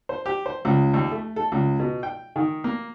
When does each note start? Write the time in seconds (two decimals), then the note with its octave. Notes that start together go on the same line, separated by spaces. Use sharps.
0.09 C5
0.26 G4
0.46 C5
0.65 C#2
0.94 D#2
1.12 A3
1.36 A4
1.52 C#2
1.80 B2
2.03 G5
2.36 D#3
2.64 A#3